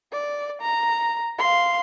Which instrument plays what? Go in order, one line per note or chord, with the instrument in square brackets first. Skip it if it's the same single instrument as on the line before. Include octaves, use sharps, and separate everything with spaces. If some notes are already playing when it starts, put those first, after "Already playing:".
[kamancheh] D5
A#5
F5 C6